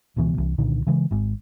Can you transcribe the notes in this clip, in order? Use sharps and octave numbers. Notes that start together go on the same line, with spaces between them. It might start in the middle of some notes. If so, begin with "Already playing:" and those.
D1 C#2 B2 E3
C2 E3
C2 A#2 D3 D#3
C#3 E3 G#3
G#1 G#2